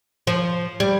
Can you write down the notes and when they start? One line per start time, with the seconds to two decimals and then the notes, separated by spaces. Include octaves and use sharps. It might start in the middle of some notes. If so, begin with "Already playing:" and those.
0.27 F3
0.80 G3